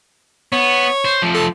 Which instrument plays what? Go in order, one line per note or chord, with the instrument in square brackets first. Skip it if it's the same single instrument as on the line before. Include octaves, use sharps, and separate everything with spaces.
[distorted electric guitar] B3 [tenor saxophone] C#5
[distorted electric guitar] C5
F3 A3
[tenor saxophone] A4